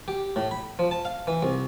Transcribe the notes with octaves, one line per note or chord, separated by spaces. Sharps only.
G4
A2
B5
F3
A5
F5
E3
C2